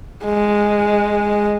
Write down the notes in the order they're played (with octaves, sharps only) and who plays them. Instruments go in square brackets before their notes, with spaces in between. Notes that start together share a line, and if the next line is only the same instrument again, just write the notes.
[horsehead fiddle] G#3